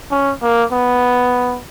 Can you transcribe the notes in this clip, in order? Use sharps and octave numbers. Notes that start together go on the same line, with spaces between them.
C#4
A#3
B3